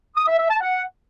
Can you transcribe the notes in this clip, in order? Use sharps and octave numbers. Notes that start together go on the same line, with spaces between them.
D#6
E5
E5
A5
F#5